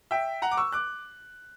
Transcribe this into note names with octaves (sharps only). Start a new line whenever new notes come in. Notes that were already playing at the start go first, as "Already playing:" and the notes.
E5 G5
F#5 A#5
D6
C#6 E6
D6 F#6